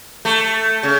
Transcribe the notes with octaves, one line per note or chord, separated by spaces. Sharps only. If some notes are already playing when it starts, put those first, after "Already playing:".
A3
C#3